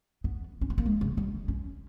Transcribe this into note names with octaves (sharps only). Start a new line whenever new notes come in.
B3
C#4
B3
A#3
G#3
C#3
G3
C#4